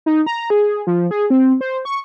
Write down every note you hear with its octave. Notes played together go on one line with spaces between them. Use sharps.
D#4
A#5
G#4
F3
G#4
C4
C5
C#6